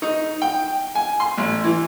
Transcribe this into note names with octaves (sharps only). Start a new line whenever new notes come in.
D#4
G5
G#5
C6
A1
E3